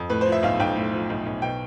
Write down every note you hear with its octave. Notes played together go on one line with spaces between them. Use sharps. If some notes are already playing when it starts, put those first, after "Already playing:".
Already playing: F2
A2 B4
F3 C5
E5
B1 F5
B1 G5
A2
F3
B1
B1
B2 G5